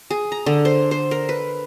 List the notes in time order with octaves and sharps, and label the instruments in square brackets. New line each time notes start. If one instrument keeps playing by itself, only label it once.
[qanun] G#4
A#5
D3
C5
C5
A#4
B4